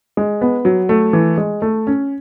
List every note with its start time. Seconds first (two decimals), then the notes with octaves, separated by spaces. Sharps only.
0.17 G#3
0.41 B3
0.65 F#3
0.89 A3
1.13 E3
1.38 G#3
1.62 A3
1.87 C#4